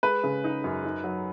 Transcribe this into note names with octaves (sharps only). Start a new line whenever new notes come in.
G#3 B4
C#3
D#4
F#2
D#4
F#3